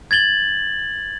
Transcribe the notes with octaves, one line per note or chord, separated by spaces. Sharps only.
G#6 A6 F#7 G7